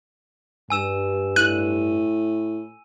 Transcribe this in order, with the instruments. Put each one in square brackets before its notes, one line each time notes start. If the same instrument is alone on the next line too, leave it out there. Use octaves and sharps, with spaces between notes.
[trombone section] G2 [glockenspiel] G#5 E6 E7
[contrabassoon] A2 [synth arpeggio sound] F#6 [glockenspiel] D#7